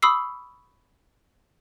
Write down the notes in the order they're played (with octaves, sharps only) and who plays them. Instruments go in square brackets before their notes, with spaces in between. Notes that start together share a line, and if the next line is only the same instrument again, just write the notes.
[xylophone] B5 C#6 D#6 E6 C7